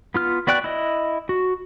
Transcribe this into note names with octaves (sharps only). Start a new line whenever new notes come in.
B3 F4 F6
B3 F#4 D5 G5 F#6
E4 D#5
F#4